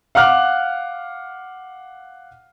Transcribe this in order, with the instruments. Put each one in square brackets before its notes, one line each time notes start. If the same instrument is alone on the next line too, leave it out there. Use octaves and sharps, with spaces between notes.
[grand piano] F5 F#5 D6 F6 F#6